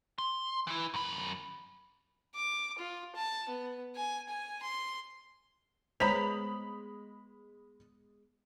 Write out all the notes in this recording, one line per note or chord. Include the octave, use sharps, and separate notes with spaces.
C6
E3 E4
F#2 B5
D6
F4
A5
B3
G#5
G#5
C6
G#3 B3 C5 C#5 A#5 B5 B6 F7